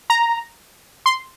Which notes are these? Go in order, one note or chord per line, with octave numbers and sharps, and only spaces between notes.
A#5
C6